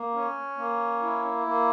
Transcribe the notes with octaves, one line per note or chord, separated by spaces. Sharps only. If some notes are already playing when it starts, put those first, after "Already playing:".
Already playing: A#3
C#4
A#3
E4
A#3